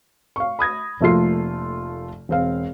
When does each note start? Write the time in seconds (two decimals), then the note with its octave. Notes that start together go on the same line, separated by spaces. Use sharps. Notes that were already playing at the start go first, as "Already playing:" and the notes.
0.36 F5 C#6
0.59 B5 D#6 G#6 A#6
1.00 F1 F3 A3 A#3 F4 C7
2.29 E1 C4 F5